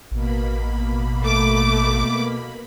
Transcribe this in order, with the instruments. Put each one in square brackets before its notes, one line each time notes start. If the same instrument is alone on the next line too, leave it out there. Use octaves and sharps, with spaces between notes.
[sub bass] A1 [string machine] B2 A#3 B5
[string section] A3 D6